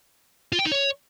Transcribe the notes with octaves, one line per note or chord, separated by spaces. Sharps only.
F4
G5
D#4
C#5